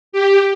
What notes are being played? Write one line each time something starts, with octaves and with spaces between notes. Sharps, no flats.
G4